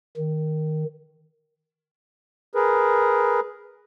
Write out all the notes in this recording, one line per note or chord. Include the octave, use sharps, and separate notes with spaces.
D#3
G#4 A#4 B4